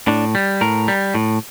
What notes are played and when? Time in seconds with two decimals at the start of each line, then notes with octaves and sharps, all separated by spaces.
0.07 A2 D4
0.35 G3
0.61 A2 A#4
0.88 G3
1.14 A2